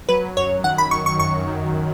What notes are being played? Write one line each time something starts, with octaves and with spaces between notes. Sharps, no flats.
F#3 B4
F#2 C#5
D#3 F#5
B5
D#3 C#6
C#6
F#2 C#6
D#3